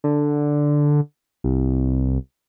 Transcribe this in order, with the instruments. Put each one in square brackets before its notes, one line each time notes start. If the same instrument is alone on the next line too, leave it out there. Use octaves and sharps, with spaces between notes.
[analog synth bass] D3
C2